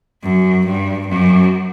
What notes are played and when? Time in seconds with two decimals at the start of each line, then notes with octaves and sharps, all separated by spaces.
0.23 F#2
0.65 G2
1.07 F#2